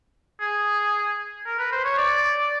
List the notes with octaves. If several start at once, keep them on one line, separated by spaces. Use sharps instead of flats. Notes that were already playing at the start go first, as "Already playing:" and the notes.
G#4
A#4
B4
C5
C#5
D5